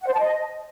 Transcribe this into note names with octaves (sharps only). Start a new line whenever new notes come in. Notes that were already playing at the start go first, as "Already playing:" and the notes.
F#5
C5
A5
D#5